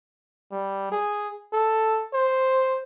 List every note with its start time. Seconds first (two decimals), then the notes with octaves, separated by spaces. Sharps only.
0.52 G3
0.92 G#4
1.53 A4
2.13 C5